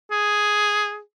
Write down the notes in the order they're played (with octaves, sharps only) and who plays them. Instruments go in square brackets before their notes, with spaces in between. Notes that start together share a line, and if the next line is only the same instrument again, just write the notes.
[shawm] G#4